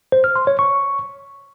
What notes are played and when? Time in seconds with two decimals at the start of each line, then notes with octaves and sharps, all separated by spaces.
0.12 C5
0.24 F6
0.36 C6
0.47 C#5
0.59 C#6